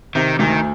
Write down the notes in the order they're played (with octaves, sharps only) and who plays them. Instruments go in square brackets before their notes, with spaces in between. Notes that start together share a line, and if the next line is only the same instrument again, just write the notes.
[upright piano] C3 [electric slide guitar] D#3
[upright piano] D2 [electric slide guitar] D#3